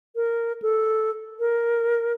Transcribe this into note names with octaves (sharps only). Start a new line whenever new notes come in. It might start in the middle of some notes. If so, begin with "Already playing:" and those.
A#4
A4
A#4